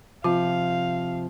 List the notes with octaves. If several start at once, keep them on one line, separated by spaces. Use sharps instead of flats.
C3 F3 F4 F5